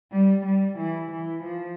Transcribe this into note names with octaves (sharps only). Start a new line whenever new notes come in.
G3
G3
E3
E3
F3